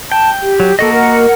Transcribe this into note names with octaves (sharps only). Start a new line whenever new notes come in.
G5 A5
G4
F#3
A#3 F#4 A4 D#5
A#4 F#5